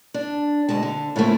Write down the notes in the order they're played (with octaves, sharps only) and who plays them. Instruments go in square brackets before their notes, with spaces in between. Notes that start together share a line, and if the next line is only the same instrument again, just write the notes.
[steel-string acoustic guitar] D4
D2 B2 G#3 A5
D3
A2 C#3 F3 A3 A#3